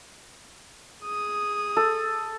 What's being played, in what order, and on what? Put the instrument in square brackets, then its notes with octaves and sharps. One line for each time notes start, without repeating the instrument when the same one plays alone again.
[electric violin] G#4 D#6
[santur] A4